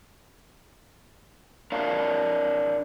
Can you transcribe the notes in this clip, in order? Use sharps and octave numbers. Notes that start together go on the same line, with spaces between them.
D4 A#4 C#5 F5